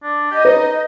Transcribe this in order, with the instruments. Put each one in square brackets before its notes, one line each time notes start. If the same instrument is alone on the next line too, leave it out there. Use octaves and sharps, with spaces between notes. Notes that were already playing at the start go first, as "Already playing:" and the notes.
[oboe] D4
[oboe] G4 [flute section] D#5
[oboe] D#4 [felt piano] B4